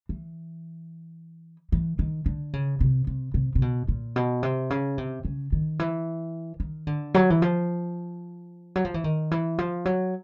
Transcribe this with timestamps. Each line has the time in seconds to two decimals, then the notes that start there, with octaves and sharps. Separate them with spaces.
0.09 E3
1.72 E3
1.99 D#3
2.26 D3
2.53 C#3
2.81 C3
3.07 C3
3.34 C3
3.55 C3
3.62 B2
3.88 A#2
4.16 B2
4.43 C3
4.70 C#3
4.98 C3
5.25 C#3
5.52 D#3
5.79 E3
6.60 D#3
6.87 D3
7.14 F#3
7.30 E3
7.42 F3
8.76 F#3
8.85 F3
8.94 E3
9.04 D#3
9.31 E3
9.58 F3
9.85 F#3